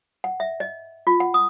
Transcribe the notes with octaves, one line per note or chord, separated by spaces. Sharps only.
F#5
E5
D#5
F4
F#5
D#6